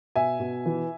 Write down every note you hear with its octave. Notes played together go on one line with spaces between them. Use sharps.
B2 E5 G#5
B2
E3